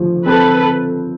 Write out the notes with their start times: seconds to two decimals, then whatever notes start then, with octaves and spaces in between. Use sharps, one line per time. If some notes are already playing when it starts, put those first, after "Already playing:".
Already playing: F3 A3
0.25 C4 A4 B4